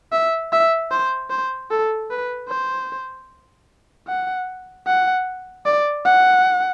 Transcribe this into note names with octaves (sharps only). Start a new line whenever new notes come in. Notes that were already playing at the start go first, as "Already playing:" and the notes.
E5
E5
C5
C5
A4
B4
C5
F#5
F#5
D5
F#5